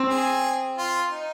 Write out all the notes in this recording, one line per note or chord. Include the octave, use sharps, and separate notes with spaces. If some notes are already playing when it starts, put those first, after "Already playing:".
Already playing: C4
G#4
F4
D#4